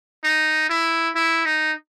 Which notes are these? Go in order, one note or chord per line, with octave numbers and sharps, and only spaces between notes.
D#4
E4
E4
D#4